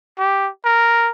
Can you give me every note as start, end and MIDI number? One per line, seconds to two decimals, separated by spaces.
0.19 0.49 67
0.65 1.12 70